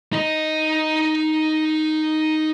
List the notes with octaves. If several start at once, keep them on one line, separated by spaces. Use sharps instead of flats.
D#4 D#5